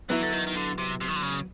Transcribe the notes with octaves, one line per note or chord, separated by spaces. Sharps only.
E3 F#3 B3 E4
D3
D#3
D#3
D3
C3
C3
D#3
D3
C#3